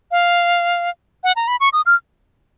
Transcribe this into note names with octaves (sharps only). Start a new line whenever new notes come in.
F5
F#5
A#5
B5
C#6
D#6
F6